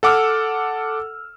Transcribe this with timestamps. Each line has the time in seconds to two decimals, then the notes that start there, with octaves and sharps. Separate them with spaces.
0.03 A4 F#5 D6 E6 F6